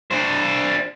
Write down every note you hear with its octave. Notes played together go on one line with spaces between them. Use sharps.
D4 C5